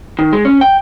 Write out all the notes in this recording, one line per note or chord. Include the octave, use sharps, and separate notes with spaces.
D#3
G#3
C#4
G5